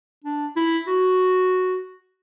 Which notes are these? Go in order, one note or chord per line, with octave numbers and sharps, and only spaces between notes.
D4
E4
F#4